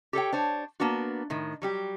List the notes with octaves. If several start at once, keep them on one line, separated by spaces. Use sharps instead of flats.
G4 A4 C#5 G5
D4 C5 C#5
A#3 B3 D4 F#4
A2 D#3
F#3 G3 G4